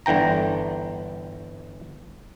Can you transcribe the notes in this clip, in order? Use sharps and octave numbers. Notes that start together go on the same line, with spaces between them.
G1 D3 E3 G5 A#5